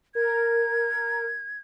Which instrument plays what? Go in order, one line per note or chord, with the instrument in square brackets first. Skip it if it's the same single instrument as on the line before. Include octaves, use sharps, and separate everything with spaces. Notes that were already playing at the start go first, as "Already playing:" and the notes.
[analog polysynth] A#4 [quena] G#6